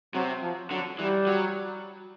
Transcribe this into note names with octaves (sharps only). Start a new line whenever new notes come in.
C3 F#3
F3
D3 F#3
E3 G3
F#3